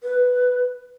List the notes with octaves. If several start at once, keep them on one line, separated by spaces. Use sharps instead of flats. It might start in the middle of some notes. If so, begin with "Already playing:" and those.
B4